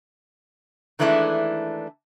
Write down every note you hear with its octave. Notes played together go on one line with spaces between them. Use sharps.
D#3 E3 G#3 A3 D4 E4